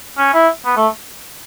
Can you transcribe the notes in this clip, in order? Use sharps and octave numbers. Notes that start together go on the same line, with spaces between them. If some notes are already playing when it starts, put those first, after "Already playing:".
C#4
E4
B3
A3